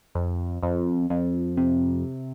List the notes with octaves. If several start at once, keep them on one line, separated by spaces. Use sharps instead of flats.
F2
F2
F2
C3